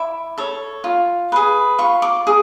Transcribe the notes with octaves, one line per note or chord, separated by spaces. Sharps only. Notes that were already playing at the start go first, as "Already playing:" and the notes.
Already playing: E4 D6
A4 C#5
F4
G#4 B4
F4 C#6
D6
G#4